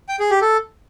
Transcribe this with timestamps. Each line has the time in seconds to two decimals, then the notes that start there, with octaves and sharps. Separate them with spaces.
0.09 G5
0.20 G#4
0.31 G4
0.42 A4